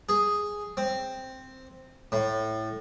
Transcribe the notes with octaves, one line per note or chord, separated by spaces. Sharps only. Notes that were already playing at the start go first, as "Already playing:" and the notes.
G#4
C4
A2